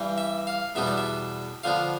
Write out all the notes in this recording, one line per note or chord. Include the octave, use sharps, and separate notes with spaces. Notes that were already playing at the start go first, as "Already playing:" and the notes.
Already playing: G2 E3 G3
E5
F5
E2 B2 G3 B3 D4 E5
D5
E5
D3 F3 B3 D4 F5